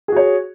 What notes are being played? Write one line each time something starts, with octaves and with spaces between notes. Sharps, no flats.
F#4 G#4 C#5